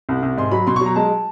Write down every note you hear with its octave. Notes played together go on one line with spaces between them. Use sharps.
C2
C2
G#2 C6
F#3 B5
B2 C6
C#6
F#3
A#5
G#3 A5